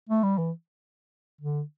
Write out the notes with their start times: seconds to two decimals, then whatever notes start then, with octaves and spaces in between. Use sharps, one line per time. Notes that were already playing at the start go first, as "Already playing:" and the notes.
0.09 A3
0.23 G3
0.38 E3
1.41 D3